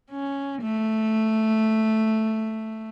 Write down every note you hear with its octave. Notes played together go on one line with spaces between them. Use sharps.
C#4
A3